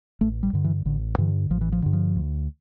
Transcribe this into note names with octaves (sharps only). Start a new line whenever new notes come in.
A1 A3
G3
G2 D3
E3
A1 D3
G2 D3 E3
A1 F3
E3
F3
G2 D3
F3
D2